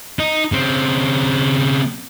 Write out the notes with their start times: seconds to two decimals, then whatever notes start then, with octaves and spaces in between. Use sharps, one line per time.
0.19 D#4
0.52 C#3 C4